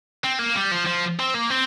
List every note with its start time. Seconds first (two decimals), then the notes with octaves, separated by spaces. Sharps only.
0.24 C4
0.39 A#3
0.56 G3
0.72 F3
0.87 F3
1.20 C4
1.34 A#3
1.50 C4